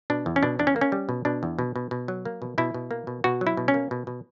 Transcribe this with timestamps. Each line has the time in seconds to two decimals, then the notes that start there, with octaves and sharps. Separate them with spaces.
0.10 B2 D4
0.26 E2
0.36 C#4
0.43 B2 D4
0.59 E2 D4
0.67 C#4
0.76 A#3
0.81 C#4
0.92 G3
1.09 B2
1.25 B2 D4
1.43 E2
1.59 B2
1.76 B2
1.91 B2
2.08 F#3
2.25 A#3
2.42 B2
2.58 B2 E4
2.74 B2
2.91 A#3
3.07 B2
3.24 B2 F#4
3.41 F#3
3.47 E4
3.57 B2
3.68 C#4
3.74 A#3
3.91 B2
4.07 B2